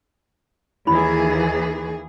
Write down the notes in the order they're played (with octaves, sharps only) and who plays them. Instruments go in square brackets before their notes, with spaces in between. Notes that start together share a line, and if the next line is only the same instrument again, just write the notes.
[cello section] D#2 E3 G#4 [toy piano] E4 B5